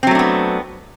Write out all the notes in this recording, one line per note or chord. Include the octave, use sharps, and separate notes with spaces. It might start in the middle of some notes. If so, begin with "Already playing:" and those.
F#3 A3 B3 C4 D4